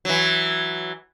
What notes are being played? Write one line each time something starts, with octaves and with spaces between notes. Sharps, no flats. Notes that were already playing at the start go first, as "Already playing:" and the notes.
E3 F#3